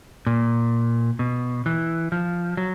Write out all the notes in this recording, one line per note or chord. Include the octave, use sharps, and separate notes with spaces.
A#2
B2
E3
F3
F#3